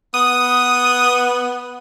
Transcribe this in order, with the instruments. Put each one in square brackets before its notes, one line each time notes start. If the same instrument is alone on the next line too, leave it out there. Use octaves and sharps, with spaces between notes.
[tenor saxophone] B3 [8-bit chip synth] D#6